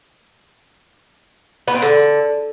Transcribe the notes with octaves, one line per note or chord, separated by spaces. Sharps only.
B3
C4
D3